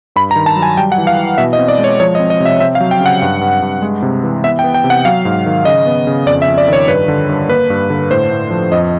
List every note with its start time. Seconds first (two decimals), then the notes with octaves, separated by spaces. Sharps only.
0.16 G2 B5
0.31 A#5
0.36 D#3
0.46 A5
0.56 F#3
0.62 G#5
0.77 G3 G5
0.92 F#5
0.98 E3
1.07 F5
1.17 E3
1.38 B2 E5
1.53 D#5
1.58 C4
1.68 D5
1.79 G#3
1.84 C#5
2.00 F3 C#5
2.15 D#5
2.19 C4
2.30 D#5
2.40 C3
2.45 E5
2.60 C4 E5
2.75 F5
2.80 F#3
2.91 G5
3.00 C#3
3.06 F#5
3.22 G2
3.41 G2
3.62 G2
3.82 G#3
4.02 C3
4.23 E3
4.44 B3 E5
4.59 G5
4.64 B3
4.74 G5
4.84 C3
4.90 F#5
5.05 F#3 F5
5.25 G#2
5.46 D#3
5.65 C#3 D#5
5.86 B3
6.07 C#3
6.27 F2 D5
6.42 E5
6.48 F2
6.58 D5
6.68 D#3 C#5
6.88 G2 B4
7.08 D3
7.29 G2
7.49 A#3 B4
7.70 G2
7.90 D3
8.11 A2 C5
8.31 A2
8.51 F3
8.72 F2 D#5